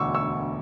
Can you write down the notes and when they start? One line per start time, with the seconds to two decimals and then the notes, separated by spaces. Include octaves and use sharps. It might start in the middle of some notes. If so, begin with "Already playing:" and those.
Already playing: E1 D2 D3 C#6 D6 E6
0.14 C#6 E6